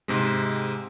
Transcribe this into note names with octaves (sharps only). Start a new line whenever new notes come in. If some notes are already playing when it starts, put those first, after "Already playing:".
G#2 C3 G#3